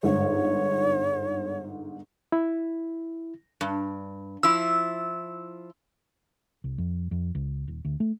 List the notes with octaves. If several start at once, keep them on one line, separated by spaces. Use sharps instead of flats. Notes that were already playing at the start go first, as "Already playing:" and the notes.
G1 G#2 C#5
E4
G2
F3 E4 E6
C2
F2
F2
C#2
D#1
D2
A3